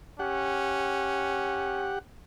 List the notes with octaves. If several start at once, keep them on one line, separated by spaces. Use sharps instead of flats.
C#4 G4 F#5